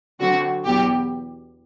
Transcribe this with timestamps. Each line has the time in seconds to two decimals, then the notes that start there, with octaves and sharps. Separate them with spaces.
0.20 D3 F#3 C4 F#4
0.66 E2 B2 F#3 B3 G4